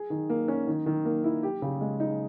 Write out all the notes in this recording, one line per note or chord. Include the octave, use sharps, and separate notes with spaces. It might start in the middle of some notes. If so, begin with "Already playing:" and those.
Already playing: G#4
D#3
A#3
C#4
D#3
D#3
A#3
E4
G4
C#3
G#3
D#4